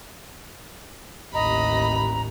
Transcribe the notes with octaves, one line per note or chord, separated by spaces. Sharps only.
A1 D#2 D#5 A#5 B5